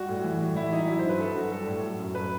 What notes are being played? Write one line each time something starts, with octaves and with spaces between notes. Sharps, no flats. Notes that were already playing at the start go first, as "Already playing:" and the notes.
Already playing: G3 F#4
A2
E3
G3
E3 E4
G3 D#4
F#3 E4
C5
G2 B4
F#3 A4
G2 F#4
G3 A4
A2
F#3
F#2
F#3 B4